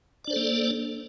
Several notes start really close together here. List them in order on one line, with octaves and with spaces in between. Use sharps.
D5 D4 C5 A4 A#3